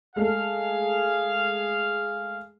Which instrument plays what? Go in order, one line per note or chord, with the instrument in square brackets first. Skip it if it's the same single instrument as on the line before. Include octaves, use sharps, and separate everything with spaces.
[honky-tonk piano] G#3 A3 [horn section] G#4 F5